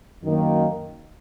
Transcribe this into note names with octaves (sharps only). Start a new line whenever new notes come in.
F#2 D#3 A#3